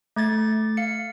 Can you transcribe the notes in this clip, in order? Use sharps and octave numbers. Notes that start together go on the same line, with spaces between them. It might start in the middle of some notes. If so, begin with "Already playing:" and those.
A3 G#6 A6
F5 C#7